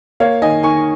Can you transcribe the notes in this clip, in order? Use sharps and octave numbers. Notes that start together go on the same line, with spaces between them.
A#3 C#5 F5
D#3 D#5 G#5
D#3 G#5 C#6